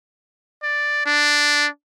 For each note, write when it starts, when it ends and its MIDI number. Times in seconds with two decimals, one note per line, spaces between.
0.63 1.01 74
1.06 1.67 62